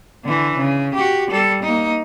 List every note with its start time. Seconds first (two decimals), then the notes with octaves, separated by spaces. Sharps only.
0.24 D3 E3
0.56 C#3
0.94 F#4 G4
1.31 G3 A4
1.62 A#3 D#4